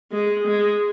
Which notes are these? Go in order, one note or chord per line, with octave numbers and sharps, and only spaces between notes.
G#3
G#3